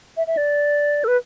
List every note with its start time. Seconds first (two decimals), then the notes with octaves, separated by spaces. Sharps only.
0.17 E5
0.27 E5
0.37 D5
1.04 A4
1.08 B4